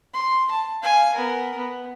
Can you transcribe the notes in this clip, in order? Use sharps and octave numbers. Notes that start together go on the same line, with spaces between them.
C6
A5
F5 G#5
B3 A#4
B3